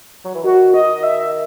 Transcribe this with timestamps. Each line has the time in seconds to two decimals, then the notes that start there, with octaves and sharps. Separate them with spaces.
0.24 F#3
0.34 E3
0.43 D#3 F#4
0.74 D#5
1.03 E5